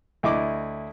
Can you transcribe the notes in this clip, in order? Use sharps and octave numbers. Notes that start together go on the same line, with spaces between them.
D2 E4 D#5 D6